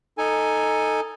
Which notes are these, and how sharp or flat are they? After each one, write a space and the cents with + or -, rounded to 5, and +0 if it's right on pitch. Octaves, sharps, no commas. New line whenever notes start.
D#4 +0 A4 +10 G#5 +0